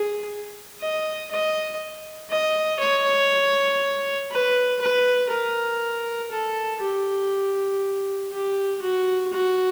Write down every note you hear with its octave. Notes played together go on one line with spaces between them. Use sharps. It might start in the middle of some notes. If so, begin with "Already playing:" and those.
Already playing: G#4
D#5
D#5
D#5
C#5
B4
B4
A#4
A4
G4
G4
F#4
F#4